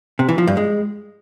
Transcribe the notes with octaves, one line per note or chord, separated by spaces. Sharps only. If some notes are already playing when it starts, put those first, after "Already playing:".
C3
E3
F3
G2
G#3